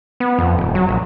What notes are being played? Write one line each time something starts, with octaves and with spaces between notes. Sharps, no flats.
B3
F2
D#1
F#3
A#1